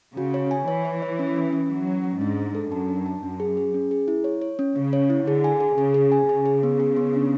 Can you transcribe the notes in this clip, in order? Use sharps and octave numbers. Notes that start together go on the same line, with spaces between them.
C#3 F#4
C#5
G#5
E3 C#5
C#5
C#5
C#4
C#4
C#4
F#3 C#4
C#4
C#4
G#2 D4
D4
A4
F#2 A5
D4
A5
F#2 C#4
G#4
G#4
C#4
G#4
E4
C#5
C#5
C#4
C#3 C#4
C#5
E4
D3 G#4
G#5
G#4
C#3 G#4
G#4
G#5
C#3 G#4
G#4
B3
G#4
B3
D4